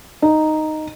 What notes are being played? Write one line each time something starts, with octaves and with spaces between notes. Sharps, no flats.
D#4